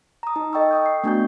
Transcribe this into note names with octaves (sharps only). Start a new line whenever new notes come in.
A#5 D#6
D#4
A4 D#5 G5 C#6 E6
G5 D#6 G6
C7
A3 B3 D4 F#4 G#5 G6